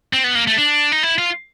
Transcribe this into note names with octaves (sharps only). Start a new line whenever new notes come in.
C4
B3
A#3
A3
D4
D#4
E4
F4